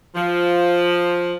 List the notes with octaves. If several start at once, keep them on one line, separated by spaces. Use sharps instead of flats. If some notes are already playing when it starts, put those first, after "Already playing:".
F3